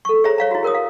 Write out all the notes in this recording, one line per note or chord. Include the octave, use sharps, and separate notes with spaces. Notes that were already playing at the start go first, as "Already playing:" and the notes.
A4 C#6
G#4 C5 C#5 E5 A#5
C#5 F5 A#5
E4 F#4
G#4 A#4 C#5 D#6
F5